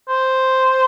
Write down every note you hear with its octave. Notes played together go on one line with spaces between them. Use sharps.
C5